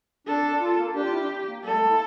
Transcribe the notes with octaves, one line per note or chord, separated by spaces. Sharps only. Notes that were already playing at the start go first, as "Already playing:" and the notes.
D4 A4
F4
A#3
D4 G4
F4
E4
D4
A#3
G3 A4
A3
A#3
E4